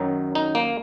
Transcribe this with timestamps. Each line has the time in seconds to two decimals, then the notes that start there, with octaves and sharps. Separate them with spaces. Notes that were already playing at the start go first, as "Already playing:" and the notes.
Already playing: F#2 D#3 F#3 D#4
0.35 D#4
0.55 A#3